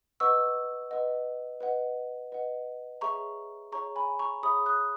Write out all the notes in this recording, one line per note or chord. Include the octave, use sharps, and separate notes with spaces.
B4 D#5 F#5 C#6 E6
B4 D#5 F#5
B4 D#5 F#5
B4 D#5 F#5
G#4 C#5 E5 A#5 C#6
G#4 C#5 E5 A#5 C#6
G#5 B5
A#5 C#6
G#4 C#5 E5 B5 D#6
D#6 F#6